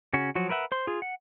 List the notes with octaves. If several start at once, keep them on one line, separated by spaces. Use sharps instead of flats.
C#3 C#4 F#4
F3 F#3 F#4
A#4 B4 E5 F#5
C5 C6
F4 G#4
F#5